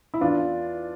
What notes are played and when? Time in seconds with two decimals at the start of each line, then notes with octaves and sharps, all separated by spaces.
0.14 E4
0.21 E2 D4 F4